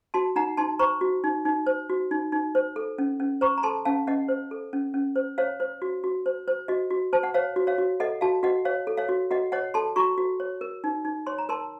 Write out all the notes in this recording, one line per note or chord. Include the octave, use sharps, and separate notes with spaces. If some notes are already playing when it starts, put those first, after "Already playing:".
F#4 A5 C6
D#4 F#5 A#5
D#4 A5 C6
C5 A#5 C#6
F#4
D#4
D#4
C5
F#4
D#4
D#4
C5
A4
C#4
C#4
C5 A#5 C#6
A#5
A4 A5 C6
C#4 F5 A5
C#4 D#5 F#5
C5
A4
C#4
C#4
C5
C5 C#5 F5
C5
F#4
F#4
C5
C5
F#4 D#5
F#4
C5 A5
F#5
C5 C#5 F5
F#4
C#5 F5
F#4
A4 D#5 F#5
F#4 F5 A5
F#4 D#5 F#5
C#5 F5
A4
C#5 F5
F#4
F#4 D#5 F#5
C#5 D#5 F#5
A4 A5 C6
F#4 A#5 C#6
F#4
C#5
A#4
D#4
D#4
C#5 C6
A#5
A#4 A5 C6